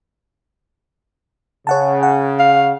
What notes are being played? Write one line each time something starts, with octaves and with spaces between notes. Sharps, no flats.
C#3 C#5 F#5 A5
F#5
F5